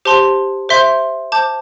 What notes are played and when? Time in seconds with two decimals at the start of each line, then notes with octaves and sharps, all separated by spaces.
0.05 G4 C5 A5 C6
0.69 C5 E5 C6 G6
1.32 C5 A5 D6 G6